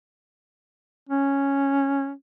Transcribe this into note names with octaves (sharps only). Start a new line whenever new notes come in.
C#4